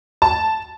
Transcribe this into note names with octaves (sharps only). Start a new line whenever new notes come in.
A5